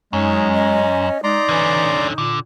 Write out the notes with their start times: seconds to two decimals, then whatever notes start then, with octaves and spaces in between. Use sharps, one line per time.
0.13 F#2 G#3 C#4 D#4
0.53 D#5
1.24 G#3 D#4 D5 A#5 C6
1.49 D3 E3 C#4
2.18 A#2 D3